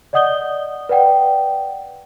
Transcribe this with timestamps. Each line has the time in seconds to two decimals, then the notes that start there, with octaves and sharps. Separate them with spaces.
0.13 D5 D#5 F#5 D#6 G6 G7
0.89 B4 D5 F#5 G5